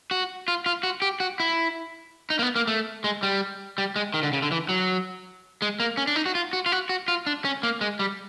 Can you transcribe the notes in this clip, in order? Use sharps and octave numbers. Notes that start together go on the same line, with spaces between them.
F#4
F4
F4
F#4
G4
F#4
E4
D#4
A#3
B3
A#3
A3
G#3
G3
G3
G#3
D#3
D3
C#3
D3
E3
F#3
G#3
A#3
C#4
D4
D#4
F#4
F4
F#4
F4
F#4
F#4
F4
D4
C#4
A#3
G#3
G3